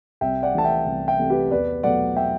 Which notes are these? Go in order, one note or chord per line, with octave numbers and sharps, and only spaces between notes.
C2 E5 G5
D5 F#5
C3 E3 A3 A5
E5 G5
C2
E5 G5
C3 E3 A3
G4 B4
E2 B4 D5
B2 F#3 A3 D5 F#5
E5 G5